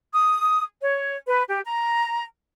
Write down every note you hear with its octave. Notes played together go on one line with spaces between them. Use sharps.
D#6
C#5
B4
G4
A#5